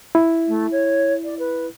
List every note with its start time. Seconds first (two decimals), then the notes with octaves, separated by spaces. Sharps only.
0.15 E4
0.47 A3
0.71 C#5
1.24 D5
1.39 B4